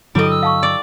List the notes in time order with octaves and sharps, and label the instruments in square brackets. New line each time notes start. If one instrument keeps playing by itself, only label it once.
[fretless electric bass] G2 D3 F#3 [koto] G3 D#5 [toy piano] E4 A4 [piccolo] D7
[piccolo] E6
[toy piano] F5 A5 C#6
[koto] D5